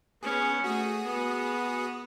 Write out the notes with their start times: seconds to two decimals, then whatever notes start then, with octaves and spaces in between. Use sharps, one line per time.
0.23 B3 C#4 G#4
0.64 A3 F#4 G#4 D#6
1.04 B3